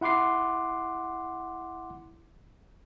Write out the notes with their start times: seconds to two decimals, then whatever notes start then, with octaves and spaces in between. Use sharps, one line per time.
0.01 E4 F#5 C6 D6 C7